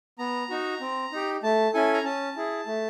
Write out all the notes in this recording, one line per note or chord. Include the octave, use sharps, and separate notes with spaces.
B3 A#5
D#4 F#4
C4
D#4 G4
A3 A5
C#4 E4 A4 G#5
A#5
C#4 A5
E4 G#4
A3